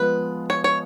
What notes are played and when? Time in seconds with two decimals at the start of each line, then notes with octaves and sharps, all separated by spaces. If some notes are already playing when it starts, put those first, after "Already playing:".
Already playing: F3 G#3 B3 B4
0.50 C#5
0.64 C#5